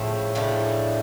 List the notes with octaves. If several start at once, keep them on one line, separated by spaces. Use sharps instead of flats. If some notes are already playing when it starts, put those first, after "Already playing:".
Already playing: A2 C#3 F3 A3
C#3 F3 A3 D4